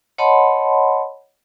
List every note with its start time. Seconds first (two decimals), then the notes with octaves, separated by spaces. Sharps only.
0.18 C#5 D#5 F#5 A5 B5 C6